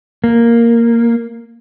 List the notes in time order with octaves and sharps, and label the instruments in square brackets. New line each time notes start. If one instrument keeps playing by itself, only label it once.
[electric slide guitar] A#3